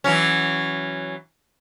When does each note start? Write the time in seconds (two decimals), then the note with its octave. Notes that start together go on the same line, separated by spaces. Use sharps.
0.04 E3 F#3 C#4